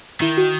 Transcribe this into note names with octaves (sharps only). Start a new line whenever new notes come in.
D#3 E4
F#4